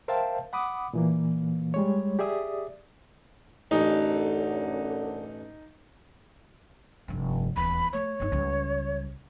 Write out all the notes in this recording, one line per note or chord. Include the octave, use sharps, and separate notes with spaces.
A#4 C5 E5 F5 G5 A5
F#5 B5 D6 D#6
A#2 E3 A#3
G3 G#3 C#5
G4 G#4 D5 E5 D#6
A1 F#2 D3 D#4
F1 G2
D#1 E2 B5
A3 C#5
G1 D#4
C#2 G3